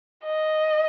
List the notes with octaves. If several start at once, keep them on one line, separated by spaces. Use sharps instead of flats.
D#5